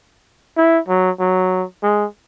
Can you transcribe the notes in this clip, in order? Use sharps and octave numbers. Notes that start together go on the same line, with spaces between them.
E4
F#3
F#3
G#3